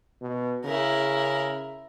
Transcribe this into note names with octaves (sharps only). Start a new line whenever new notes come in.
B2
C#3 E4 A#4